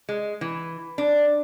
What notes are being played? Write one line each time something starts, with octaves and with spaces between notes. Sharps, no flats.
G#3
E3
D4